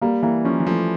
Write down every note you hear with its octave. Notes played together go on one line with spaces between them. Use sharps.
G3 A#3
E3 A#3
F3 C#4
E3
F3 A3